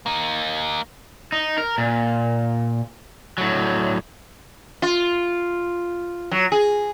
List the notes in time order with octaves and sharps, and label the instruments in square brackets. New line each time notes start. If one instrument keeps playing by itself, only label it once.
[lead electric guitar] A#3 D#4
[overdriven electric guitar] D#4
A#4
A#2
A2 F#3
[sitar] F4
F#3
G#4